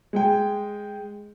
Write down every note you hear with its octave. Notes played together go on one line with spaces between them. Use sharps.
G#3 G#4 G5